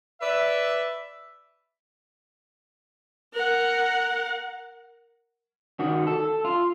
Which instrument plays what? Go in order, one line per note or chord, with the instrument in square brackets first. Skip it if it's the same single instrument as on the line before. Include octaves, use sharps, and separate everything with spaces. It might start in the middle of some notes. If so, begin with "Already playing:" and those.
[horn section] B4 D5 E5
[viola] A#4 F#5
[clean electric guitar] D#3 F#4
A4
F4